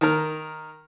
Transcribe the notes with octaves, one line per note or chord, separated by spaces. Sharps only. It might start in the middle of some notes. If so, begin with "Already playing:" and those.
D#3 A#4